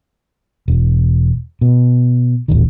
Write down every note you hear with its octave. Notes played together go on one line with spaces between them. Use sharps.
E1
B2
D#1 A1 D#3